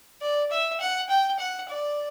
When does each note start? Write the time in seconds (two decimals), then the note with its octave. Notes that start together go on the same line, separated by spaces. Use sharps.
0.22 D5
0.51 E5
0.80 F#5
1.09 G5
1.39 F#5
1.68 D5